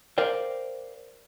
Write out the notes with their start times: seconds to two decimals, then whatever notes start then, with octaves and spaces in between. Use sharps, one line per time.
0.18 A#4 C5 D5 F5 G5